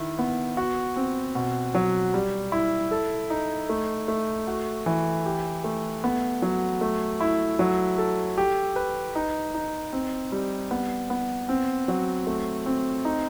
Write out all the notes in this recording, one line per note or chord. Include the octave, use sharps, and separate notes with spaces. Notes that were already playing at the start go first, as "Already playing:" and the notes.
Already playing: D#3 E4
B3
F#4
C4
B2
F#3
G3
E4
A4
D#4
A3
A3
F#4
E3
G4
A3
B3
F#3
A3
E4
F#3
A4
G4
B4
D#4
D#4
C4
G3
B3
B3
C4
F#3
A3
C4
D#4